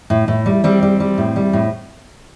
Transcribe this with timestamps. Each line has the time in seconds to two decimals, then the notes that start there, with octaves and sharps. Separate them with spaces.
0.10 A2
0.28 A2
0.46 G3
0.64 G3 C4
0.83 G3
1.00 G3
1.18 A2
1.36 G3
1.53 A2